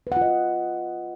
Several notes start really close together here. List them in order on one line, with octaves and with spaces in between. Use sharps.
B4 F#5 F4 D#5